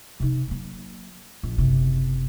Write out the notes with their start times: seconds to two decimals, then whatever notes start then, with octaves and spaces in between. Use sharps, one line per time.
0.20 C3 D#4
0.48 F#3 A#3
1.43 A#1
1.57 F#1 C3